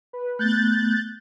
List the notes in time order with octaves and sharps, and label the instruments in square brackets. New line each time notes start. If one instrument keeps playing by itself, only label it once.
[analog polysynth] B4
[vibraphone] A3 B3 [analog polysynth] F#6 G6 A6